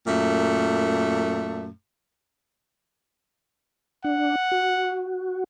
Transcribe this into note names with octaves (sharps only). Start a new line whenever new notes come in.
F#2 A#2 A3
D4 F#5
F#4